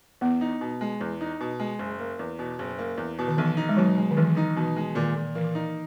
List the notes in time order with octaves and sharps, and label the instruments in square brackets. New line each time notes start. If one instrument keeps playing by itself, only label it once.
[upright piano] E2 [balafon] B3
[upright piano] D#4
B2
G#3
E2
D#4
B2
G#3
F#1
A#3
E2
B2
F#1
A#3
E2
B2
[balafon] D#3
[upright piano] B1 [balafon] E3
[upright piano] D#4
[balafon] G#3
[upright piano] B2 [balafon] F#3
[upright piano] G#3
[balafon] D#3
[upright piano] B1 [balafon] E3
[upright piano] D#4
[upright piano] B2 [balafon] E3
[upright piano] G#3
[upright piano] A#2 [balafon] D#3
[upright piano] A#2
[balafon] E3 [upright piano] A#3
[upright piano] D#4